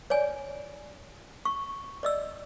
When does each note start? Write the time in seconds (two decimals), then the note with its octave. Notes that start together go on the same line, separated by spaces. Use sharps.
0.10 C#5 D5 G#5
1.45 C#6
2.03 D5 D#5 E6